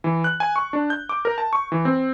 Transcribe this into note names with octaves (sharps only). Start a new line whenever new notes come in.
E3
F#6
G#5
C#6
D4
G6
D6
A#4
A5
C#6
E3
C4